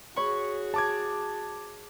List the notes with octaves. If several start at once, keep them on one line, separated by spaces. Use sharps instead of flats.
F#4 G#4 C#5 B5 C#6
A5 D6 G#6